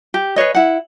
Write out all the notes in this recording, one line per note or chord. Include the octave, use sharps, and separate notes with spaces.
G4
G#4 B4 C#5 D#5
E4 F#5